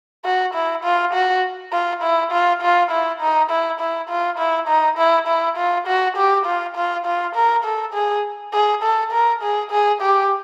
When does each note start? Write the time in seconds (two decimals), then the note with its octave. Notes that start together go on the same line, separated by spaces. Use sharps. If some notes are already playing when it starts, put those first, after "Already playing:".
0.25 F#4
0.54 E4
0.84 F4
1.14 F#4
1.72 F4
2.02 E4
2.32 F4
2.62 F4
2.91 E4
3.21 D#4
3.50 E4
3.80 E4
4.09 F4
4.38 E4
4.68 D#4
4.98 E4
5.28 E4
5.57 F4
5.87 F#4
6.17 G4
6.46 F4
6.76 F4
7.06 F4
7.35 A#4
7.64 A4
7.94 G#4
8.53 G#4
8.83 A4
9.12 A#4
9.42 G#4
9.71 G#4
10.01 G4